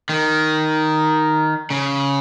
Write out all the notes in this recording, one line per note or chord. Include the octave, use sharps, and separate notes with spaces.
D#3
C#3